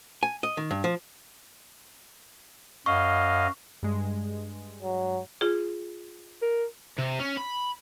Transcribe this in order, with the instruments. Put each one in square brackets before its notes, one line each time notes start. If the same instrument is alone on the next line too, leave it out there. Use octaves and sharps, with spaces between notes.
[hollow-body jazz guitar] G#5
D#5
D#3
G2
F3
[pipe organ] F#2 D#5 F5 [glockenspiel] C#6
[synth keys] G2 G#3
[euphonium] F#3
[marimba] F4 G#4
[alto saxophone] A#4
[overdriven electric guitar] C3
C#4
B5